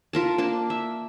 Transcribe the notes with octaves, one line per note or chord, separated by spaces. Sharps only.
F4 A#4 A5
A#3 D4 A5
E5